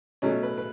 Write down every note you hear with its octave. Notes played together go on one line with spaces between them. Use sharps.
B2 F#3 A3 C#4
B4
B4